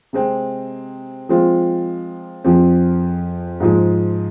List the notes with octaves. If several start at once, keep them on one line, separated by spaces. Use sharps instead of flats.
C3 G#3 C4
F3 G#3 C4 F4
F2 F3 C4 G#4
G#2 F3 G#3